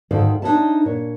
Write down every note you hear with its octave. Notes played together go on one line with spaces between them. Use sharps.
D2 G#2 D#3 A4 D5 F5
D4 D#4 A4 C#5 E5 A5
A#2 C#5